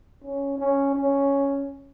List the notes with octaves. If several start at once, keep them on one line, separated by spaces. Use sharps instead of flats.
C#4
C#4
C#4